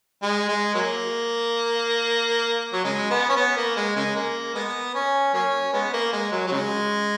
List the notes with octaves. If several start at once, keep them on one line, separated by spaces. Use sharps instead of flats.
G#3
G#3
F#3 A#3
F#3
C#3 G#3
B3
C#4
B3
A#3
G#3
C#3 G#3
A#3
G#3 B3
C#4
F#3 A#3 C#4
G#3 B3
A#3
G#3
F#3
F#3
C#3 G#3